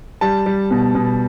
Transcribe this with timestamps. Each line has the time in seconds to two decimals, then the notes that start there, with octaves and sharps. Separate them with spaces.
0.21 G3 A5
0.46 G3
0.71 B2
0.95 B2